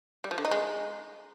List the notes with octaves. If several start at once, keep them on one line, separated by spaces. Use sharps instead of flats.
G3
F3
D3
D#4
G#3